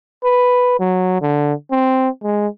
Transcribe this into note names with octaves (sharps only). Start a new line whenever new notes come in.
B4
F#3
D3
C4
G#3